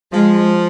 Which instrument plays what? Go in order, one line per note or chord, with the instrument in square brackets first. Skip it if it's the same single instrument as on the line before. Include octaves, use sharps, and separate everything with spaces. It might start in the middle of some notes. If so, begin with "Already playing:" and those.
[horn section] F3 [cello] G#3